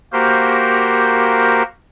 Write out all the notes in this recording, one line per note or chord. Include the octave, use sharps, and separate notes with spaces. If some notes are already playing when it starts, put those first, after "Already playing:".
A#3 F#4 G4 A#4 C5